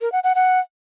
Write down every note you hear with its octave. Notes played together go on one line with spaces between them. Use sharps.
A#4
F#5
F#5
F#5